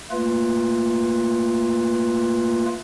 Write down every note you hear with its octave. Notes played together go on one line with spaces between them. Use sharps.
A3 A#3 F4 B4